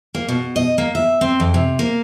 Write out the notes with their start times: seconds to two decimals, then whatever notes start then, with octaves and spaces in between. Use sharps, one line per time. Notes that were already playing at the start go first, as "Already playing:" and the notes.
0.15 A#3
0.28 B2
0.56 D#5
0.78 A#3
0.95 E5
1.21 C4
1.40 F2
1.54 C3
1.79 A#3